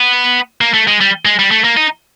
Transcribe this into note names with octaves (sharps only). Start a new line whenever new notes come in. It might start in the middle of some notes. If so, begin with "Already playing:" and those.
Already playing: B3
A#3
A3
G#3
G3
G#3
G3
A3
A#3
D#4